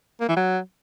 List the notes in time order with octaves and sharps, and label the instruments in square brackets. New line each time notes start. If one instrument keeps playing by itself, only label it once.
[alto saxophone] A#3
E3
F#3